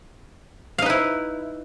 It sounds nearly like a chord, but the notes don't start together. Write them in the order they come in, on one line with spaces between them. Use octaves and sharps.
F5 D#4 B4 E4